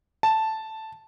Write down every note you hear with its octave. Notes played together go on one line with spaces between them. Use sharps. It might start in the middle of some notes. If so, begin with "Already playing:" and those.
A5